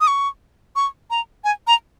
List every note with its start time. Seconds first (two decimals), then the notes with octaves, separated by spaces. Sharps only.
0.01 D#6
0.07 C#6
0.76 C#6
1.10 A#5
1.44 G#5
1.67 A#5